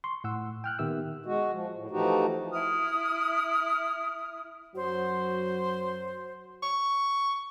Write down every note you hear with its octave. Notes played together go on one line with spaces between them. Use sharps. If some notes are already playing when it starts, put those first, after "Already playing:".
C6 C#6
A2 F#5 E6
G5 F6 F#6
A#2 D#3 B3 G4 E5 E6
G#3 F#4
F3
A2
E3 F3 A3 D#4 F#4 G4
E4 D#6 F6
F#2 F#3 F#4 C5
C#6